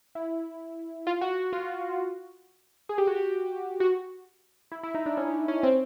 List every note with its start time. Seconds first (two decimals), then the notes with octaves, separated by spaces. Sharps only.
0.15 E4
1.07 F4
1.21 F#4
1.53 F4
2.89 G#4
2.98 G4
3.07 F#4
3.16 G4
3.80 F#4
4.72 E4
4.83 E4
4.94 D#4
5.06 D4
5.17 C#4
5.48 C#4
5.63 C4